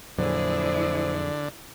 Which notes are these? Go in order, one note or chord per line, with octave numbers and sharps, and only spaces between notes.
F2 A#2 D3 F#3 E4 G#4 C5 D5